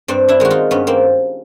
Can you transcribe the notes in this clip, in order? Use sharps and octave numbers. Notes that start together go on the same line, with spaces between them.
G2 C4 D4
D4 E4
D#3 G#3 F#4
D#4 F4
G2 B3 C#4
A#3 C4